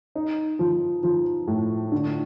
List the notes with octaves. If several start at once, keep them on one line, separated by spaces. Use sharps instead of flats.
D#4
F3
F3
A2
D3